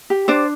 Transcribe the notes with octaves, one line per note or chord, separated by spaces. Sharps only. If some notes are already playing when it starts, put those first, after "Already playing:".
G4
D4 C5 D5